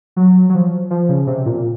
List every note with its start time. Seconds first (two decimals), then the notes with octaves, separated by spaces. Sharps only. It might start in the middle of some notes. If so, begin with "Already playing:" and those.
0.16 F#3
0.50 F#3
0.54 F3
0.91 F3
1.09 C#3
1.27 C3
1.46 A#2